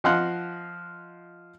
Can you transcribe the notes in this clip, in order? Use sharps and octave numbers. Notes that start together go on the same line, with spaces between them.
F3 D#5 F5 F#5 C6 F#6